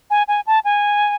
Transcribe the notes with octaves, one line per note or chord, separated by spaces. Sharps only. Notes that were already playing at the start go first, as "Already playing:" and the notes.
G#5
G#5
A5
G#5